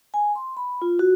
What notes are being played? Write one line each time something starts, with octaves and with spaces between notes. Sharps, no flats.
G#5
C6
B5
F4
F#4